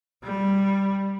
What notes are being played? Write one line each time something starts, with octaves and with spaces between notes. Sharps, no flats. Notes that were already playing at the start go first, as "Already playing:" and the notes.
G3